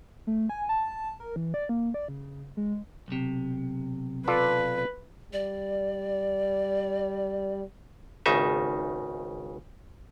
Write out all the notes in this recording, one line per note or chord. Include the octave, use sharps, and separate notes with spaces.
A3
G#5
A5
A#4
E3
D5
A#3
D5
C#3
G#3
B1 C3
F4 A4 B4 D5
G3 D5
G#1 C#2 C#3 D#4 E5